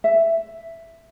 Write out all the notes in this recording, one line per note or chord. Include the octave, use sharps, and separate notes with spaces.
E5